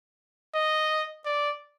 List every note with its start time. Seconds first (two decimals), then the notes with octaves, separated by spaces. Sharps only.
0.55 D#5
1.25 D5